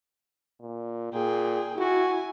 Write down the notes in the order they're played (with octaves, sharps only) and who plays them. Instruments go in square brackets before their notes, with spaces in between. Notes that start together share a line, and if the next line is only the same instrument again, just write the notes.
[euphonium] A#2
[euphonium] A#2 [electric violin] G#4 G5
[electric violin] E4 G#5 [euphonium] F#4